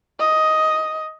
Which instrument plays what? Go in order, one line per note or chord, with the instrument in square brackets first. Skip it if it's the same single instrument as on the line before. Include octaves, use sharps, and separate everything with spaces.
[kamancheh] D#5